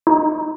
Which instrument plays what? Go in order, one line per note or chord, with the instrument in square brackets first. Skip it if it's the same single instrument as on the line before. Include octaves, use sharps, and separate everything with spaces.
[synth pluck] D#4